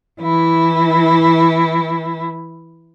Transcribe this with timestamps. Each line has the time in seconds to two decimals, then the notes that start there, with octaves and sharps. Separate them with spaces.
0.22 E3 E4